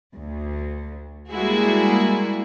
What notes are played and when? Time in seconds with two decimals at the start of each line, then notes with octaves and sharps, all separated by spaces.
0.14 D2
1.31 G3 G#3 A#3 E4 F#4 G#4